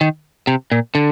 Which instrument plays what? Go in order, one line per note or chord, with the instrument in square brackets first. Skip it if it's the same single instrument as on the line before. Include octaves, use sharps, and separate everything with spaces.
[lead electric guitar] D#3
C3
A#2
D3